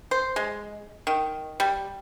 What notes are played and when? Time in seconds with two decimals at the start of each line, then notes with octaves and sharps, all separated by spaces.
0.11 C5
0.36 G#3
1.07 D#3
1.60 G3